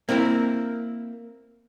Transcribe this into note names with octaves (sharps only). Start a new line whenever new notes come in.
A#3 C4 E4 A#4